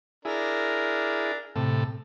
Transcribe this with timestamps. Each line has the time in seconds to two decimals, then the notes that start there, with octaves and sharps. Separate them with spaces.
0.25 D4 E4 G#4 A#4
1.56 A2 C3 A4